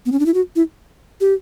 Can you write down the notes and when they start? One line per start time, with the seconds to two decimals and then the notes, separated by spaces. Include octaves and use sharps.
0.06 B3
0.12 C#4
0.20 D4
0.26 E4
0.34 F#4
0.56 E4
1.21 G4